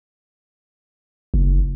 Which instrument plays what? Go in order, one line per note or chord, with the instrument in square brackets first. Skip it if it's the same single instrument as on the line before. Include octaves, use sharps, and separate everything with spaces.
[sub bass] F#1